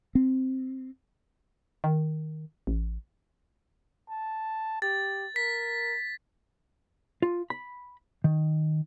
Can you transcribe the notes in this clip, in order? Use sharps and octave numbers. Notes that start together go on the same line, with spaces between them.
C4
D#3
A1
A5
G4 A6
A#4 B6
F4
B5
D#3